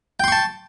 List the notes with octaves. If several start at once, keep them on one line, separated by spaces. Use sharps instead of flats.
G5 A5 C6 C#6